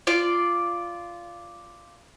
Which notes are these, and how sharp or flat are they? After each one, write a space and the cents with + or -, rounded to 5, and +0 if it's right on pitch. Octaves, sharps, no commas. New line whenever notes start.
F4 -10 D5 +0